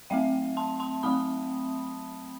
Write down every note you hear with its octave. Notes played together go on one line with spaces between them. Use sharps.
F#3 A3 C4 E5 G5
A5 C6
A5 C6
F#3 A3 C4 B5 D#6